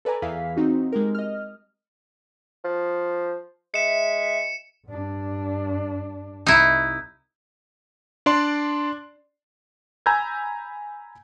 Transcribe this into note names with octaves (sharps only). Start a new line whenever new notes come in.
A4 B4 D5 G#5 A#5
E2 E3 E4 G#4 F5 B6
C4 D#4 F#4
G#3 G4 A#4
D#5 F6
F3
G#3 E5 C#7 E7
G2 D4
C2 D#4 E4
D4 D5 C6
G#5 A#5 B5 E6 G6 G#6